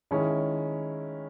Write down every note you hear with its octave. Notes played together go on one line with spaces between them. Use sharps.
D#3 G#3 C#4 E4